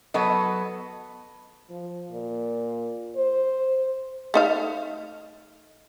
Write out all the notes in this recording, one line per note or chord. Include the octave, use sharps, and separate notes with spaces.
F#3 B3 A4 D#5
F3
A#2
C5
A3 D#4 F5